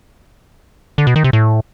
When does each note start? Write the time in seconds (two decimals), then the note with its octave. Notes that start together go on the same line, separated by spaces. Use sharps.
0.98 D3
1.07 B2
1.16 D#3
1.24 C3
1.33 A2